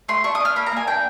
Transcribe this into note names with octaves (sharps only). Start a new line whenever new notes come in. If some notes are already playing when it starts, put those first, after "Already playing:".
A3 C6
D4 C#6
D#6
D4 F6
A#3 B5
A#5
A#3 G#5
D4 G5